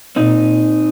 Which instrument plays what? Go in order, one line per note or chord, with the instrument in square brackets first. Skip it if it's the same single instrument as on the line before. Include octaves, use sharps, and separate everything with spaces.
[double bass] A#2 [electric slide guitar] C4 D#4